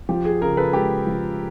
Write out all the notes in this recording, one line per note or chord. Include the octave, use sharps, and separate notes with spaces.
F3 G4
G#4
C#3 G#4 A#4
A4 B4
G#3 G4 A4
F3